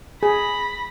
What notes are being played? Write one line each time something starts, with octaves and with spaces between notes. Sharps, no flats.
G#4 B5 A#6